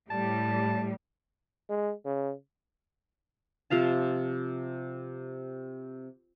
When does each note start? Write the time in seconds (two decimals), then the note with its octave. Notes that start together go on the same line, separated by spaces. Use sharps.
0.10 A2 G3 A5
1.69 G#3
2.05 C#3
3.70 C3 F3 F5 A5